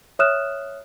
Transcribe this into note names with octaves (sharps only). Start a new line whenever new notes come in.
C#5 E5 D#6 F6 F#6 E7